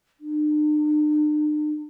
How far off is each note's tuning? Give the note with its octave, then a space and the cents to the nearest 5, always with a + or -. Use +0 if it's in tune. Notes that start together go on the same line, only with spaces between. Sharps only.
D4 +45